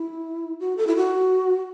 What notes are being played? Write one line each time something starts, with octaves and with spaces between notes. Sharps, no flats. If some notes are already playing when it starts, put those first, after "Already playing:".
Already playing: E4
F#4
A4
E4
F#4